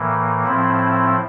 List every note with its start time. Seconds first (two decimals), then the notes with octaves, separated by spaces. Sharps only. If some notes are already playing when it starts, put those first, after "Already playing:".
Already playing: A2 E3 A#3
0.44 A2 F3 C4 E4